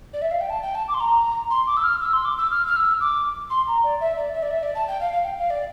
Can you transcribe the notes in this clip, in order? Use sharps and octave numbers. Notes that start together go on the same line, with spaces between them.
D5
E5
F5
G5
A5
G5
A5
D6
C6
A#5
C6
D6
E6
F6
E6
C6
D6
E6
F6
F6
E6
D6
C6
A#5
D5
E5
D5
E5
D5
E5
D5
A5
G5
F5
F5
G5
F5
D5